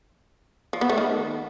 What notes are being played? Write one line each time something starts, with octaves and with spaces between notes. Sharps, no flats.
F3
B3
A3
D#3